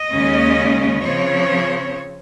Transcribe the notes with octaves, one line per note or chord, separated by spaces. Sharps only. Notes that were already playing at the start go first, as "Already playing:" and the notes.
Already playing: D#5
D#2 C#3 G#3 C#4
C#3 F3 C4 C#5